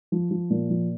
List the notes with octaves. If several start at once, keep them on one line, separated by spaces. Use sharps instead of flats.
F3
F3
A#2
F3